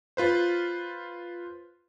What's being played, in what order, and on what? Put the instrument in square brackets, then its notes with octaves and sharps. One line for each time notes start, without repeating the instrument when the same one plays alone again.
[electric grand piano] F4 B4 C5